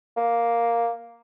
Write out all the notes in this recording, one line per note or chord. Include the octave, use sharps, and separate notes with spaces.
A#3